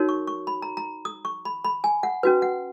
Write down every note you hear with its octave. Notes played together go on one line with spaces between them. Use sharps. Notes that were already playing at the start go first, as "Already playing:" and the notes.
Already playing: D#4 F#4 A#4 C#5
C#6
C#6
B5
A#5
A#5
D#6
C#6
B5
B5
G#5
F#5
C#4 F#4 B4
F#5